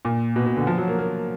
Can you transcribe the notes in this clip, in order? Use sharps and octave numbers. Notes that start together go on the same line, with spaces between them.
A#2
B2
B2
D3
F3
F#3
A#3
A#3